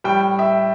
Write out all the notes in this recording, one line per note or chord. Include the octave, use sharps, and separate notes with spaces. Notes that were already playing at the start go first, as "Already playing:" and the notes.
A2 G3 G5
E5